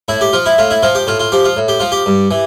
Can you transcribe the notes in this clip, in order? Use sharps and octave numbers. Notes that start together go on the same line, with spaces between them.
A2 E4
G4
F3 F4
E4
A2 F4
E4
F3 F4
G4
A2 F4
F4
F3 G4
F4
A2
G4
F3 F4
G4
G2
E3